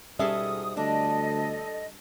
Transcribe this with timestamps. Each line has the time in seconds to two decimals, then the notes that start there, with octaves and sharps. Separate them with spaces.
0.19 G#2 B2 G3 C#4 G#4 A4 E5 D#6
0.77 D2 D4 A4 D#5